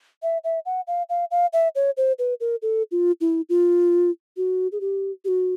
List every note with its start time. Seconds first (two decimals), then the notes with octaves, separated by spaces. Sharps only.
0.23 E5
0.44 E5
0.66 F#5
0.87 F5
1.09 F5
1.31 F5
1.53 E5
1.75 C#5
1.97 C5
2.19 B4
2.40 A#4
2.62 A4
2.91 F4
3.21 E4
3.49 F4
4.37 F#4
4.72 G#4
4.81 G4
5.25 G4
5.28 F#4